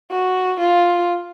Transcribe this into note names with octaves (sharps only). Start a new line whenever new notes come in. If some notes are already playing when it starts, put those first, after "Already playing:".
F#4
F4